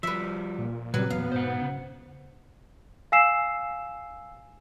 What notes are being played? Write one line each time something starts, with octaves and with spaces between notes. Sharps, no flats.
F3 G3 B4 E5
A#2
A#2 C#3 F#3 G3 C4 B4
E2 A#2 B3 F5
G#2 B2 C5 F#5
C#3
F5 G#5 E6 C7 E7